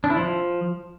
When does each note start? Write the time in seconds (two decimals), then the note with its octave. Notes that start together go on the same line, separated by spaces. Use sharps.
0.04 D4
0.10 E4
0.16 F3